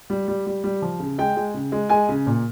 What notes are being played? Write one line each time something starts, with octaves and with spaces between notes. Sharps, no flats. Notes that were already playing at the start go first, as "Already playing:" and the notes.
G3
G3
G3
G3
F3
C#3
G#3 G5
G#3
C#3
G#3
G#3 G#5
C#3
A#2